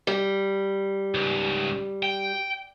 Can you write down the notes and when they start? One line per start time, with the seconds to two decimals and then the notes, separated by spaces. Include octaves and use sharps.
0.07 G3
1.14 C#2 G#2
2.03 G5